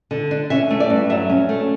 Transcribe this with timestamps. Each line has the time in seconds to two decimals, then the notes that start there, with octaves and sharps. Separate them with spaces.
0.11 D3
0.31 D4
0.50 C#4 E5
0.71 A3
0.80 D5
0.90 G2
1.10 F#3 E5
1.29 C#4
1.49 A3